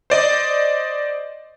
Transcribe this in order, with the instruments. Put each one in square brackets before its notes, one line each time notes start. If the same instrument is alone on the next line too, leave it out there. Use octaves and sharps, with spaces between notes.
[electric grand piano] C5 D5 D#5